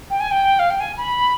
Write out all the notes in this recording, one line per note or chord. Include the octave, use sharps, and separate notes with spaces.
G5
G#5
G5
F5
G5
G#5
B5